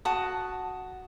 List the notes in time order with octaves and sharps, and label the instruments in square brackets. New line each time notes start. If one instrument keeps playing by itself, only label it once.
[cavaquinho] F#4 A5 D#6